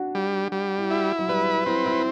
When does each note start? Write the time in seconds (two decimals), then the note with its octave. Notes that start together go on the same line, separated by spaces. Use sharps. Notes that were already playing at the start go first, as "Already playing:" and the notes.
Already playing: D4 F#4
0.15 G3
0.52 G3
0.78 E4
0.90 E4 F#4
1.19 F#3
1.28 G3 B4
1.66 C4 E4
1.86 E4